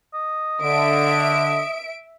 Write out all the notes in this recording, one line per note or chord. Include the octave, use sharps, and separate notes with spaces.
D#5
D3 E5 D7